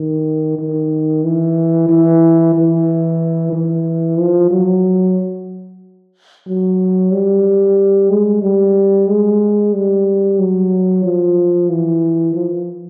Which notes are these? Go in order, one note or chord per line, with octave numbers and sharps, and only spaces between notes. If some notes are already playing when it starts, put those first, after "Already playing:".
Already playing: D#3
D#3
E3
E3
E3
E3
F3
F#3
F#3
G3
G#3
G3
G#3
G3
F#3
F3
E3
F3